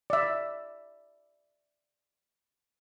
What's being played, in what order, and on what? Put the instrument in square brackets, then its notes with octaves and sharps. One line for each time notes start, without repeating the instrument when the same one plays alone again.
[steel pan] D5 E5